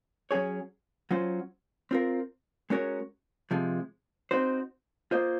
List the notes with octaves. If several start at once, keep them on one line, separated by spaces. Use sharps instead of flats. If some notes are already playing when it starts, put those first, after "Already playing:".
F#3 C#4 G#4 C#5
F#3 C#4 F4 C5
C4 F4 A#4
G#3 C#4 F#4 A#4 C#5
C3 F3 G#3
C4 D#4 F#4 C5
A#3 F4 C5 D#5